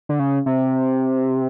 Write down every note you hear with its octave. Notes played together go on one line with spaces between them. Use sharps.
D3
C#3
C3